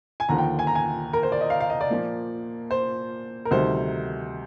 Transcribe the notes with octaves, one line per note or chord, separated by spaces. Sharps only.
G#5
D#2 D3 F3 A#5
G5
G#5
A#5
G#5
A#4
C5
D5
D#5
F5
F5
D#5
D5
A#2 F3 A#3
C5
A#4
D2 C3 D#3 G3 C5